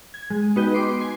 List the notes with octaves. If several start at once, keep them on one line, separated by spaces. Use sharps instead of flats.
G#6
G#3
B3 D#4 F#4 B4 D#5 G5
C6 D6 C7
G#5 C6